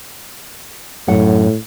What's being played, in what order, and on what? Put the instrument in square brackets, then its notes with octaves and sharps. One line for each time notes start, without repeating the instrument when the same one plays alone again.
[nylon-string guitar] F#2 F#5 [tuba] A2